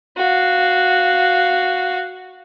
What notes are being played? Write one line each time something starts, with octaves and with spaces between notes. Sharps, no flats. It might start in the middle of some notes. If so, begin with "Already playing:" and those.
F#4 F5